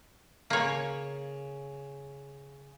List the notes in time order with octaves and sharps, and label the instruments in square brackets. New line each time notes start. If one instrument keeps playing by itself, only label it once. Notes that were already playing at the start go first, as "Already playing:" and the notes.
[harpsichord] C#3 [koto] A#3 C#5